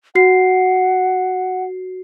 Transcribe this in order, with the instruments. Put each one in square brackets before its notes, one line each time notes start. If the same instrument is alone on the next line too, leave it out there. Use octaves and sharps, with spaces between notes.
[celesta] F#4 C7 [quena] F#5